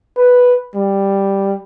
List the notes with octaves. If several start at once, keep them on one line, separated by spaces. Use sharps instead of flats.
B4
G3